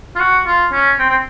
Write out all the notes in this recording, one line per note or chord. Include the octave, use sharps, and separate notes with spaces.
F4
F#4
F4
C#4
C4
C4